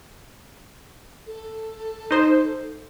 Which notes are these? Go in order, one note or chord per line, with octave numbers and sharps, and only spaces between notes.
A4
D#4 C5